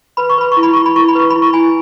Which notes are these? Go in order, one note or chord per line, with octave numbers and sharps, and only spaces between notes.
B4 B5
C#6
B4 B5
E4 C#6
B5
G4 C#6
B5
E4 C#6
B5
B4 C#6
B5
E4
C#6
E4 G#5 B5